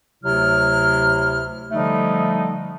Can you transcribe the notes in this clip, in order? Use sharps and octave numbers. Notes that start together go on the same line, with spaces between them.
D2 C3 F#3 E4 F6
D3 F3 G3 A3 D#4